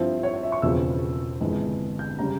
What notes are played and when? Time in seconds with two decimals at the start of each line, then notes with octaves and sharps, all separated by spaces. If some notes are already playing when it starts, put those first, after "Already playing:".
Already playing: G2 F3 C4 E4
0.23 C#5
0.33 C#5
0.43 E5
0.52 C#6
0.62 E1 E2 C#3 F3 C4 E6
1.41 G1 F2 E3 G#3
1.99 G6
2.19 C#3 G3 C#4 A#5